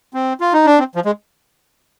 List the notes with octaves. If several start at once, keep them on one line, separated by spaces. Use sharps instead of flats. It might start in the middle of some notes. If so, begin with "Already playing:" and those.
C4
F4
D#4
D4
C4
F3
G#3